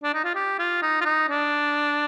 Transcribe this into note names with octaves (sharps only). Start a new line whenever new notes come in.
D4
D#4
F4
G4
F4
D#4
F4
D#4
D4